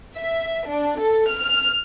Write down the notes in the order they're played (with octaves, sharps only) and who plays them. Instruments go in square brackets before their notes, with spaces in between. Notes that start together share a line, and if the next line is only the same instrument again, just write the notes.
[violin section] E5
D4
A4
F6